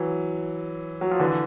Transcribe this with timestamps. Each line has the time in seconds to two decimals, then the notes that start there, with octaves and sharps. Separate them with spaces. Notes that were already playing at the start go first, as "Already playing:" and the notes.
Already playing: E3 F#3
1.01 F#3
1.11 F3
1.20 D3 E3